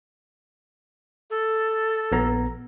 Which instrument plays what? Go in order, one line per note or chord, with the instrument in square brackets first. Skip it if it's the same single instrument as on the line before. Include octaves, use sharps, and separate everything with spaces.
[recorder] A4
[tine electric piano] A#1 B3 A#5